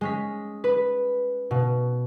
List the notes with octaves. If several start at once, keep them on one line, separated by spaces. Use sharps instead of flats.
G#3 C#4 B6
B4
B2